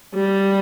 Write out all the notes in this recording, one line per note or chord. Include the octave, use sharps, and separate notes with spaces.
G3